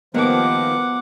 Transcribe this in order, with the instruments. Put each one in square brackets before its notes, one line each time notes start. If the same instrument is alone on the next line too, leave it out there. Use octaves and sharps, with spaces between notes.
[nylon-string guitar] D#3 G3 A#3 [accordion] F3 [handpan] B3 [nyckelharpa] F#5 D6